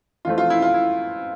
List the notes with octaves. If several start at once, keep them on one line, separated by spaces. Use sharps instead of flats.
F2 E3 A3 C4 F4
F4
E4
F4
E4